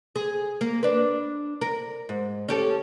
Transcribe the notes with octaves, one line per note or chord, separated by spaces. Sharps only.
G#4
A#3
D4 B4
A#4
G#2
C#4 G4 A4